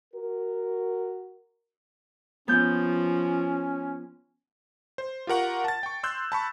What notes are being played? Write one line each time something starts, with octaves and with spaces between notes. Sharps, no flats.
F#4 A#4
F3 B3 C#4 G6
C5
F4 G4 A#4 F#5 C#6
A5 A6
G5 C#6
C6 E6 F#6 G6
A5 B5 C#6